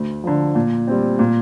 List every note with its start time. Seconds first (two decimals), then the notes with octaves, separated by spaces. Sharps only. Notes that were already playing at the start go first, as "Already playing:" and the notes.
Already playing: D2
0.24 D3 F3
0.55 A#2
0.87 G3 C4
1.19 A#2